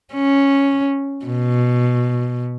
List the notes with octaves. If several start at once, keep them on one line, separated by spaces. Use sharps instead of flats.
C#4
B2